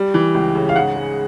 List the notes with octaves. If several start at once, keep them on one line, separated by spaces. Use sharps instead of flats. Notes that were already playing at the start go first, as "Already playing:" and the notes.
Already playing: G3
E3
C#2
C#3
F5
G#2 F#5
G#3